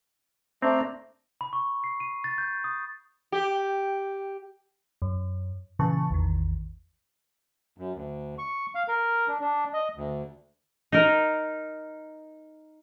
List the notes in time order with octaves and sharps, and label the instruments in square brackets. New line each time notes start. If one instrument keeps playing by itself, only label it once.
[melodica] A3 D4 A#5 [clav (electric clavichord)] C4
[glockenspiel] B5
C#6
C7
D#7
A6
G6
D#6
[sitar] G4
[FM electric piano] F#2
A#2 C#3 E3 B4 A5 C#6
A1 E2 D#3
[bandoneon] F#2
D2
C#6
F5
A#4
D4
D4
D#5
D2
[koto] D#4 A#4